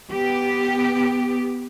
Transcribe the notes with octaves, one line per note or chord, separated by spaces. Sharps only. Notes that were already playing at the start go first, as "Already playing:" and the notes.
B3 G4